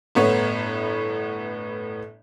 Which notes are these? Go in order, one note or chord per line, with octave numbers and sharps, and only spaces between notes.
G1 A2 B3 C#5